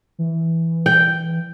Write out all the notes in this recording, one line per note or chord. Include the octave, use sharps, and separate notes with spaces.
E3
G5